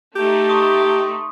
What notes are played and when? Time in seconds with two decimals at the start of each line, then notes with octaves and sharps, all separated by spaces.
0.15 A3 D#4 G4
0.49 C6 C#6 D#6